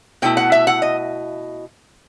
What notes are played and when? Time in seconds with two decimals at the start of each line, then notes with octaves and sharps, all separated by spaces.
0.22 B2 A3 E4 G5
0.37 F#5
0.52 E5
0.67 F#5
0.82 D#5